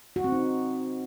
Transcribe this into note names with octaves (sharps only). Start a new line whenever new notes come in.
F#4
C4
D#4